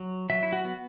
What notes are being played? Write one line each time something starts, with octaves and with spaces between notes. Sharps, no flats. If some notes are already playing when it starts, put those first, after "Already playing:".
Already playing: F#3
F#3 E5
E4
F#4
B3